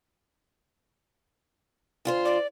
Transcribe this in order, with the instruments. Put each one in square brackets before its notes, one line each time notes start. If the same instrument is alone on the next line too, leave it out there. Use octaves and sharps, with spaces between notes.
[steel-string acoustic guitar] D2 F4 C5
[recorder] D5